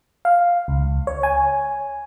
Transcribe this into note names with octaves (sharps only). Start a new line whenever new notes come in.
F5
C#2
C#5
G#5